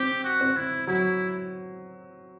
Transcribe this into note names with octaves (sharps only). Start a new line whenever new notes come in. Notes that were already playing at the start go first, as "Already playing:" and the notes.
Already playing: C4 G4
F#4
C4
E4
F#3 E4